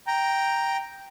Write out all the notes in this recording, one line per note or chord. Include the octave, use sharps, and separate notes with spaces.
G5 A#5